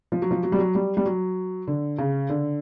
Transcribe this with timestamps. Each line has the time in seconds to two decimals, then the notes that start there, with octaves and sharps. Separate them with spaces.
0.12 F3
0.22 F#3
0.31 F3
0.43 F#3
0.52 G3
0.59 F#3
0.75 G3
0.97 G3
1.06 F#3
1.67 D3
1.98 C#3
2.29 D3